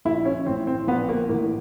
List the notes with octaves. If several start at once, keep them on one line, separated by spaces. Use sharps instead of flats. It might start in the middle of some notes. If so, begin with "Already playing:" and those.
A#1 E4
C#4
A2 E3 C4
C4
A#1 B3
A#3
A2 E3 A#3